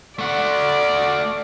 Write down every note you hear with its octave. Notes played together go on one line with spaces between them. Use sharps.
A3 D5 F#5